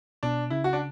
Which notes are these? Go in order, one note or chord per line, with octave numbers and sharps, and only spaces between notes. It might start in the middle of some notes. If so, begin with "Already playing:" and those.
B2 D4
C#3 E4
F#4
D4